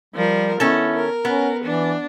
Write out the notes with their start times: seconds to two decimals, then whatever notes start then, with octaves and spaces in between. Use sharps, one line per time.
0.15 F3 G3 A#4
0.60 D#3 B3 C#4 E4 A4
0.95 A#4
1.25 B3 C#4
1.63 E3 D4